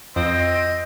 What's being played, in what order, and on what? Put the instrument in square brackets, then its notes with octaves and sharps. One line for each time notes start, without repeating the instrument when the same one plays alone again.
[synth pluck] F2 [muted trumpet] C4 [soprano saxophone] D#5